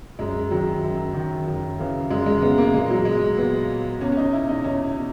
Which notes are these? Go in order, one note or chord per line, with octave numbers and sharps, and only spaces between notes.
F#2 G#3
D#3 F#3
F#2
D#3
F#2
C#3 E3
F#2 G#3
G#3
C#3 E3 B3
A#3
A#2 G#3
F#3
G#3
A#2 B3
E2 C#4
C#4
D#4
B2 E4
D#4
E2 C#4
B2